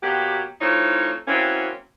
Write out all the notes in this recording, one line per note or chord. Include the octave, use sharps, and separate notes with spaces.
B2 F#3 A#3 G4
E3 A3 C4 D#4 F4 C#5
E3 F#3 A#3 C4 C#4